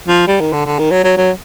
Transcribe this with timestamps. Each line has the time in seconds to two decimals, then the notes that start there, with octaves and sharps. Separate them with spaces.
0.08 F3
0.28 G3
0.40 D#3
0.53 D3
0.66 D3
0.79 D#3
0.91 F#3
1.04 F#3
1.17 F#3